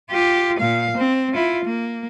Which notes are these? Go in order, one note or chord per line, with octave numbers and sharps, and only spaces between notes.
F4 G4
A#2 F5
C4
E4 F4
A#3